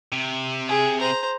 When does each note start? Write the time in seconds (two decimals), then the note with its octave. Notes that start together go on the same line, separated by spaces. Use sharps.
0.12 C3
0.68 G#4
0.99 C5 A#5